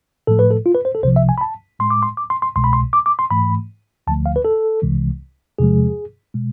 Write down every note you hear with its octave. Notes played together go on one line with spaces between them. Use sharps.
A2 F3 A3 A4
B4
A4
F4
B4
C5
A4
C2 C3 F3 C5
E5
G#5
B5
A5
A2 G#3 C6
D6
C6
D6
C6
C6
C2 B2 G#3 C6
B5
C6
D6
D6
C6
G#2 E3 A3 B5
D2 D3 F3 A3 A5
F5
B4
A4
C2 C3 E3 G#3
E2 C3 F3 G#3 G#4
B2 G#3